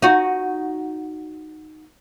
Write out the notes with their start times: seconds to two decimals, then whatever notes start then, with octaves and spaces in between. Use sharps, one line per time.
0.02 D#4 F#4